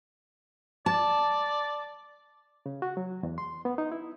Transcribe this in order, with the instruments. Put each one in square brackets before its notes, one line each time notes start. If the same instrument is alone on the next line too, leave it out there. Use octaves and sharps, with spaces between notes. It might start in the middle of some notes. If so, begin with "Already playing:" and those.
[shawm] D5 [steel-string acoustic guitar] A5
[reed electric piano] C#3
F#4
F#3
E2
C6
B3
D#4
E4